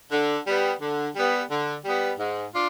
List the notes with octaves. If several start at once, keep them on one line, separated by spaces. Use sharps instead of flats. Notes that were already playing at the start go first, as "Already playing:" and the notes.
D3
G3 B3
D3
G3 B3
D3
G3 B3
G#2
D4 F4